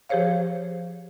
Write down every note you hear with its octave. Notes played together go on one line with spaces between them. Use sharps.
F3 G4 G#4 C5 C#5 F5